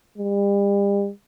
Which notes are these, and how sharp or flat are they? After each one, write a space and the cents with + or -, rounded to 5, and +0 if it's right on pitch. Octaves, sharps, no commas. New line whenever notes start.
G3 +40